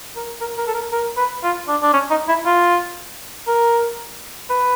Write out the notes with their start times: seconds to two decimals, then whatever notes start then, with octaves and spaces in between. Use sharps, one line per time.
0.16 A#4
0.41 A#4
0.58 A#4
0.67 A4
0.74 A#4
0.92 A#4
1.17 B4
1.43 F4
1.68 D4
1.82 D4
1.93 C#4
2.10 D#4
2.28 E4
2.46 F4
3.48 A#4
4.50 B4